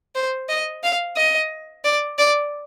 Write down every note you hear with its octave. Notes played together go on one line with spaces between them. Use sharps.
C5
D#5
F5
D#5
D5
D5